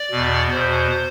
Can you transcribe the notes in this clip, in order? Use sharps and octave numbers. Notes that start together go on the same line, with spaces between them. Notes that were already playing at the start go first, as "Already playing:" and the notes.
Already playing: D5
E2 B2
E2 B2 C5